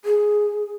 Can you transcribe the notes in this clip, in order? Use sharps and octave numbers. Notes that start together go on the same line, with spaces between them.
G#4